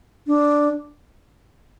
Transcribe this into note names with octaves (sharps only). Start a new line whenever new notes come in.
D4